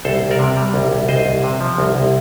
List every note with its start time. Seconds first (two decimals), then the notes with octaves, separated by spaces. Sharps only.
0.05 C2 A4 C5
0.22 C2
0.31 A#4 D5
0.39 C3
0.57 G3
0.74 C2
0.91 C2
1.08 C2 C5 D#5
1.26 C2
1.44 C3
1.61 F3
1.78 C2
1.95 C2